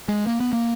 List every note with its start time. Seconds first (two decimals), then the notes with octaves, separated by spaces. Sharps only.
0.08 G#3
0.27 A#3
0.40 B3
0.53 A#3